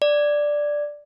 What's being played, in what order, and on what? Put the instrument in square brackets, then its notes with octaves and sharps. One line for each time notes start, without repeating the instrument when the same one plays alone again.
[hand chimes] D5